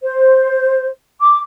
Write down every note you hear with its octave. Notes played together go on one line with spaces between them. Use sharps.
C5
D6